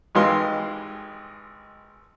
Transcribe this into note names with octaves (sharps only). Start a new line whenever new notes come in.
G#1 E3 G#3 G4 F5 C6